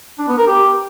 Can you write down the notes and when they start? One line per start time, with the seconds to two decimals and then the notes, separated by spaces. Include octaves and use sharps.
0.19 D4
0.28 B3
0.38 A#4
0.47 G4